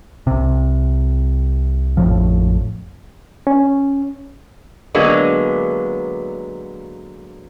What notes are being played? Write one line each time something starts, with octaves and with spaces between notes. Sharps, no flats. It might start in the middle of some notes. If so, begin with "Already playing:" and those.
C2 C3
A1 F2 A2 F3
C#4
D3 F#3 G#3 A#3 B3